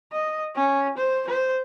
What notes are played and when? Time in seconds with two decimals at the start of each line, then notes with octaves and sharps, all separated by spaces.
0.13 D#5
0.55 C#4
0.98 C5
1.28 C5